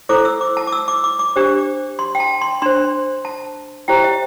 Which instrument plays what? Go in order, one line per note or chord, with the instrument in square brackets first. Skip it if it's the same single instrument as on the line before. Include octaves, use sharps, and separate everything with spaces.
[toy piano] E4 A4 C5 D6
E6
D6
A5
D6
E6
D6
D6
D6
D4 G4 C5
C6
G5
A5
C6
D4 C5 C6
A5
E4 G4 C5 G5
E5